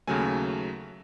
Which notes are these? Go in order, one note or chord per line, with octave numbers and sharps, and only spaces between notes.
D#2 C#3 F#3 A3 G#5